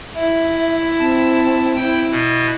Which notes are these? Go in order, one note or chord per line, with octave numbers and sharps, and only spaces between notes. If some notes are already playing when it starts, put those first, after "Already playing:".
E4 E5
C4 A5
E4 G5
B2